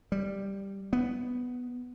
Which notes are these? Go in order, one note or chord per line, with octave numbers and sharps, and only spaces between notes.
G3
B3